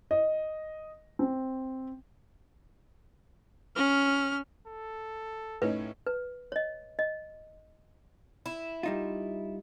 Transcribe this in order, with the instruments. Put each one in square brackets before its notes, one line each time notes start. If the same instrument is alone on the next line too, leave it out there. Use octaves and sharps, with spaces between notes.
[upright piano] D#5
C4
[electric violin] C#4 F6
[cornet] A4
[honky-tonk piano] A2 C#4 D#4 [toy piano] B4
[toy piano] B4
C#5 D#5
D#5
[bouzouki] E4
[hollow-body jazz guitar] G3 D#4 F4